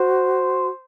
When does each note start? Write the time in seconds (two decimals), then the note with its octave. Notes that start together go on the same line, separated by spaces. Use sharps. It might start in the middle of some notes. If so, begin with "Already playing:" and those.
Already playing: F#4 C5